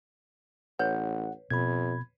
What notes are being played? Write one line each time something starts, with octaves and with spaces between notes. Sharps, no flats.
A1 B4 C#5 F#5
F2 B2 B5 G#6